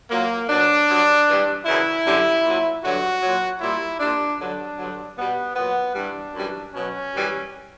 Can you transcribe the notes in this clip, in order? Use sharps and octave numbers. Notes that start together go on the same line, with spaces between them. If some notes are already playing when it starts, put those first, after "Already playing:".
A#2 F#3 A#3
B2 F#3 D4
G2 F#3
G2 E3 G3
F#2 C#3 E3 E4
F#2 D3 G3
A#2 F#3
G2 D3 F#3 F#4
A#2 F#3
A#2 G3 E4
A#2 G3 D4
G2 D3 F#3 D4
G2 D3 F#3
B2 G3 B3
A#2 F#3 B3
G2 E3 G3 D4
F#2 E3 G3
B2 F#3 C#4
F#2 E3 G3